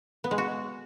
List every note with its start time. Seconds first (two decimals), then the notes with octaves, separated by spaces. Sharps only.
0.24 B3
0.31 G#3
0.38 F#4